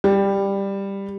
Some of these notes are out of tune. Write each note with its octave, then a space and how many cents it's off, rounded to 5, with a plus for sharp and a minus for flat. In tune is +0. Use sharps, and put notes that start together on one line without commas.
G3 +10